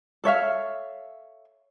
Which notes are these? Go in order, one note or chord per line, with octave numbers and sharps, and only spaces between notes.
A4 C#5 E5 F5